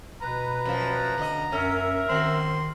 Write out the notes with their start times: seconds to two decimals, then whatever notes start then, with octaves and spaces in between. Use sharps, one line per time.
0.22 B2 B4 A#5
0.65 F#2 F3
1.18 D3 D#5
1.52 F#2 C#4 A#4 E5
2.09 D#3 C4 F#4 C6